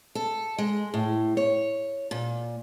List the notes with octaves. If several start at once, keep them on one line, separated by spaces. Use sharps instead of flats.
A4
G#3
A2
C#5
A#2